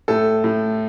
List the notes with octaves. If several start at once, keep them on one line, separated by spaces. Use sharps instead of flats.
A2 A4
A2